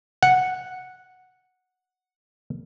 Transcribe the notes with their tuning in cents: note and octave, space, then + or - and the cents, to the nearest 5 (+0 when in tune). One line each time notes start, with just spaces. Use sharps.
F#5 -5